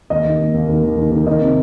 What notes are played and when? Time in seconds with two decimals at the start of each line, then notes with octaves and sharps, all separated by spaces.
0.10 D#2 D#5
0.25 D#3
0.39 D#2
0.54 D#2
0.69 D#3
0.83 D#2
0.97 D#3
1.12 D#3
1.27 D#3 D#5
1.41 C3